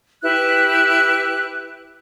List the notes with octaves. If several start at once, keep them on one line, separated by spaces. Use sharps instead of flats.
E4 G4 B4 F#6